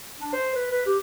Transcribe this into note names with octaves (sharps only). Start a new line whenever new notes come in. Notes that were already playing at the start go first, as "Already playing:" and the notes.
D4
C5
B4
B4
G4